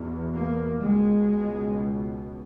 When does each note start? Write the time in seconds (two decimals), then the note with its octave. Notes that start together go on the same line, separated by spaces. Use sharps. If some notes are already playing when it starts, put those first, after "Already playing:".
Already playing: E2 B2
0.34 A#3
0.80 C#2 B2 G#3